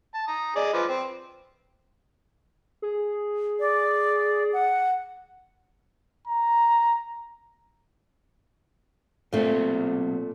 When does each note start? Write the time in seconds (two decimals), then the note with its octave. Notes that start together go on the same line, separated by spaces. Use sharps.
0.14 A5
0.27 A#5 D#6
0.56 G#4 D5 D#5
0.74 F3 B4 D6
0.89 C4
2.82 G#4
3.60 D5
4.53 F#5
6.27 A#5
9.33 B1 A#2 A3 C4 C5